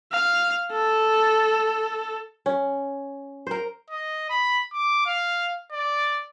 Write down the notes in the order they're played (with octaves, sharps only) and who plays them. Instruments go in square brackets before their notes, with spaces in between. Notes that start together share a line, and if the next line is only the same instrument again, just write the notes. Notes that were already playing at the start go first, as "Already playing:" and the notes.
[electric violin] F5
A4
[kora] C#4
A#4 C5
[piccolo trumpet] D#5
B5
D6
F5
D5